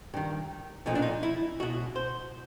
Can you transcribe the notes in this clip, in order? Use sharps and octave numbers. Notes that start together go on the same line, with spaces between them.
G2 D#3
B1 A#2 F3 D#4
D4
D#4
E4
C#2 B2 F#4
C5